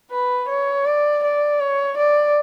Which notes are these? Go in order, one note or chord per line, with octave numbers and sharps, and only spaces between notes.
B4
C#5
D5
D5
C#5
D5